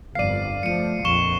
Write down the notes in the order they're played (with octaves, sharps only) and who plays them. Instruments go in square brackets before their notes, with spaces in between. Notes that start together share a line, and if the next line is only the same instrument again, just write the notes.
[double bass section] G1 F2 [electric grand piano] D5 F5 [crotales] C7 D#7
[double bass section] F3 A3 [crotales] C#7 D#7
[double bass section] A#1 F2 [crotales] C#6 E7 G7